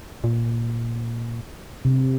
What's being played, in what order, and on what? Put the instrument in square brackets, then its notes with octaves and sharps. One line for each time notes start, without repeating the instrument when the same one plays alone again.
[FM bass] A#2
[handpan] C3